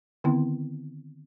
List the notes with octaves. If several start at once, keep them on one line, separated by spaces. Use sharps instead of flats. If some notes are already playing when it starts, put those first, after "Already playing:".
D3 D#3 B3 C4 E4